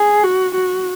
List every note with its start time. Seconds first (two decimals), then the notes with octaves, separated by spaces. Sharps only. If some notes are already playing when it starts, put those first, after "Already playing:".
Already playing: G#4
0.23 F#4
0.55 F#4